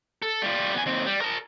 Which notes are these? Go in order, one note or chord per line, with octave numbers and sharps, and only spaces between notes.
A4
G3 F4
B3 G#5
D#2 C4
G3
A#4 A5